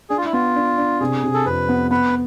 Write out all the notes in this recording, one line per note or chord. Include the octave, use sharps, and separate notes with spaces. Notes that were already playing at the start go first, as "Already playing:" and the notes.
D4 G#4
F4
E4
B3 F4
D4
D4
C3 G#4
C3
A4
F2 B4
B3
B3 B4